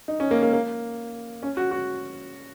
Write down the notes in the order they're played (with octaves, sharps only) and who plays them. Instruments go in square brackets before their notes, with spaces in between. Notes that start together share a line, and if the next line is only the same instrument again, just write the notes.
[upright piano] D#4
C#4
A#3
A#3
A#3
C#4
F#4
F#4